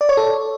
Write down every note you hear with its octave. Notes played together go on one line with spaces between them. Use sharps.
D5
C#5
A4